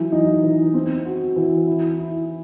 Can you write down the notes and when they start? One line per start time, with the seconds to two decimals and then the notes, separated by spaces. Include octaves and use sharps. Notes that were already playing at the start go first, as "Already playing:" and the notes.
Already playing: E3 F#3
0.12 D#4
0.43 E3
0.74 C4
1.05 F#4
1.36 E3
1.67 E4
1.98 E4